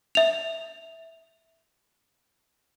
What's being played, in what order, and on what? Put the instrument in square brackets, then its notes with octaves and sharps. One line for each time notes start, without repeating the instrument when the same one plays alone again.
[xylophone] E5 F7